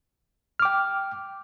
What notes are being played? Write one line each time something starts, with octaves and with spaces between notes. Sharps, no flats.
G5 D6 F6